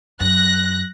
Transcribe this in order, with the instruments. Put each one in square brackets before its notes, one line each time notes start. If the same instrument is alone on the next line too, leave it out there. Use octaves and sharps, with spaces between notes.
[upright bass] F#2 [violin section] F#6 A#6